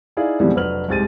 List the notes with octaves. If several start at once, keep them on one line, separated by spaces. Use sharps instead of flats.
D#4 E4 G#4 D5 F5
F2 B2 D3 E3 G3 G#3
F1 F#3 D4 B4 F6 F#7
C2 G#2 G4 A6 D#7